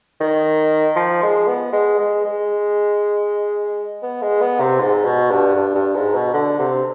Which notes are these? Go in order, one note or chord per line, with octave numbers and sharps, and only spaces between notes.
D#3
F3
G#3
B3
G#3
G#3
G#3
B3
G#3
B3
C3
G#2
B2
G2
G2
G2
G#2
B2
D3
C3